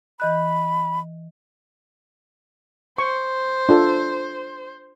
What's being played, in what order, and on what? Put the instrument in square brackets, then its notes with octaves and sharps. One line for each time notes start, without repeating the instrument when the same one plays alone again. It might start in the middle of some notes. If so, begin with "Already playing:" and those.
[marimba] E3 D#5 F#6 [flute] B5
[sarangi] C5 [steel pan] C#6
[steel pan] D4 F4 A4